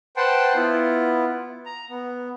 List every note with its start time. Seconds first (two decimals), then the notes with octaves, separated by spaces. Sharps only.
0.17 B4 C5 F#5 G5 A5 C6
0.55 B3 E4 F4
1.66 A#5
1.90 B3